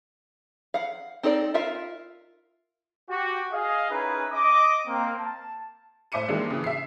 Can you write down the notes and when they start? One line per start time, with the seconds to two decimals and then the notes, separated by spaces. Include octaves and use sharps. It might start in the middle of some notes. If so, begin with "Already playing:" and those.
0.74 F5 F#5
1.23 C4 D#4 A4 C#5 D5
1.54 F4 A#4 E5 F5
3.09 F#4 G4
3.52 G#4 D#5 F5
3.90 C#4 D#4 E4 G#4 A#4 B4
4.31 D#5 D6
4.86 A#3 C4
5.19 A5
6.12 A2 C5 E5 D6 C#7 D#7
6.28 D#3 E3 G3 G#3 A#3 D4
6.50 C#3 E3
6.64 E5 C7